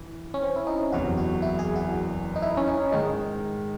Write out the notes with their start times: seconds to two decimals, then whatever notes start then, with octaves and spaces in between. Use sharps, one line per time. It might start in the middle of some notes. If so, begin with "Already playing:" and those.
Already playing: E3
0.34 C#4
0.43 C4
0.56 E4
0.67 D#4
0.92 F#1 E2 C3 F#3 F#4
1.17 F#4
1.42 E4
1.59 G#4
1.76 F#4
2.36 D#4
2.42 E4
2.57 C#4
2.68 D#4
2.92 G#2 D#3 G#3 D#4